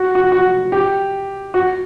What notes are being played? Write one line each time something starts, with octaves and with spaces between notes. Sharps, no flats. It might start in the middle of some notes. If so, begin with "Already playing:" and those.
Already playing: F#4
F#4
F#4
G4
F#4